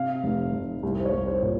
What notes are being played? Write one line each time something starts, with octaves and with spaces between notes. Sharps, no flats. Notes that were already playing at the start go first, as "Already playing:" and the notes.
Already playing: C3 F5
F1
F1
C2
C5
C#5
C2
C5
A#2